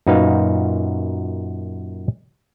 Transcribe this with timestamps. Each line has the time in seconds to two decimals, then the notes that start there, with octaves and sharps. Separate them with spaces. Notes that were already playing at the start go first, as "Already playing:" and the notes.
0.07 F#2 A#2 D#4 F#4 B4 F5